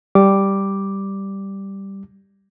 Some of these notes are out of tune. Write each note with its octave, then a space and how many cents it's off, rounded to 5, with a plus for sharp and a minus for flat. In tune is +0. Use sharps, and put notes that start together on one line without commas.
G3 +0 D6 +0